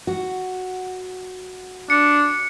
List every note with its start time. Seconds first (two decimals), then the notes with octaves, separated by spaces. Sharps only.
0.07 F#4
1.90 D4 C#7